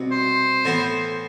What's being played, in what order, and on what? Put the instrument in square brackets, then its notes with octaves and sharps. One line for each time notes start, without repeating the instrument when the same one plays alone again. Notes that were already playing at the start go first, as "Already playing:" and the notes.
Already playing: [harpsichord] C2 B2 C4 F#4
[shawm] C5
[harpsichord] A2 E3 B3 E4